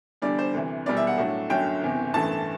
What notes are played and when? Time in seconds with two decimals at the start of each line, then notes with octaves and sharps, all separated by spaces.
0.22 E2 D3 G3 D4 D5
0.38 C5
0.54 D2 C3 E3
0.86 E1 E2 B2 G3 D5
0.97 E5
1.07 F#5
1.17 A2 F#3 A3 D4
1.50 G1 F#2 D3 F#3 G5
1.82 F#1 E2 C3
2.14 A1 G2 E3 A3 A5